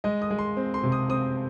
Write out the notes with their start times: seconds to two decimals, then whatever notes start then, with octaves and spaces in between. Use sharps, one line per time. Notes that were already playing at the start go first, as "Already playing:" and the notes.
0.04 G#3 D#5
0.22 D#6
0.31 G#3
0.39 C6
0.57 C4
0.74 C6
0.83 C3
0.92 D#6
1.09 C4 D#6